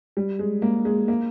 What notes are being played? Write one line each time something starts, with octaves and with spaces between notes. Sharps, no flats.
G3
G#3
A#3
G#3
A#3